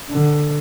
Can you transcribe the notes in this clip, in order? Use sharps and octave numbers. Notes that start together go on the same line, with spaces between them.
D3